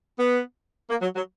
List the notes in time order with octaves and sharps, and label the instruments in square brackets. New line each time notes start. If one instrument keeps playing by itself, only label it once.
[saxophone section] B3
A#3
F#3
F#3